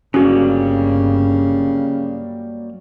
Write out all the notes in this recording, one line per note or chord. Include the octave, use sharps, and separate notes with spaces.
G1 C#3 F#3 G3 A#3 C#4 F#4